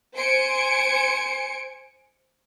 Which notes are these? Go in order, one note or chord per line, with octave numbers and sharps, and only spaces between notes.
C5 G#5 C#7 D7